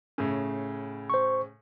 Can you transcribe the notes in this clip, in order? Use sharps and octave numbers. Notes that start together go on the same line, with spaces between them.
A2 C#3
C5 C#6